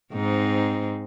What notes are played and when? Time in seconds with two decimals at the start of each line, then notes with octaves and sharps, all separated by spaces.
0.14 G#2 C4 D#4